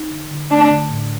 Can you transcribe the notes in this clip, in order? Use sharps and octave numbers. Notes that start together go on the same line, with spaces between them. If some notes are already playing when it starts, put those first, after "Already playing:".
Already playing: D#4
D3
D3
A3 D4
D3
A2